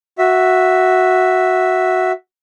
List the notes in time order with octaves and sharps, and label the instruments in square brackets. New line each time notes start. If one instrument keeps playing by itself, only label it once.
[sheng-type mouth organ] F#4 E5